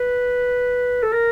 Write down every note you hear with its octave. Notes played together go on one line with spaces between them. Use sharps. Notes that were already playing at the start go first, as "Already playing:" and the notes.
Already playing: B4
A4
A#4